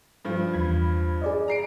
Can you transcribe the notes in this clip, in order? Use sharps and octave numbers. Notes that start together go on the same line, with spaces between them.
G2 F3
E2 B5 G#6
G#4 D5 D#5
A#5 C7 D7